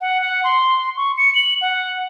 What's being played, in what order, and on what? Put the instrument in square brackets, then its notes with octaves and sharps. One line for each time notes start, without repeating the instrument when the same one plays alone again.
[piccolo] F#5
F#5
C6
C#6
C#7
F#7
F#5